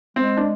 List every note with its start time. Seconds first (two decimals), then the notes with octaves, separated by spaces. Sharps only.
0.16 G#3 C4
0.37 D4